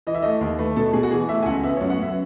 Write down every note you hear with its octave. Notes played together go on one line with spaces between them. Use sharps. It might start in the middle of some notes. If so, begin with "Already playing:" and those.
E3 D#5
E5
A3 D#5
D#2
A3 B4
B2 A4
B2 G#4
F#4
E3 G#4
A3 E5
G#5
C#2 F#5
B3 E5
C#5
F#2
F#5
F#2 E5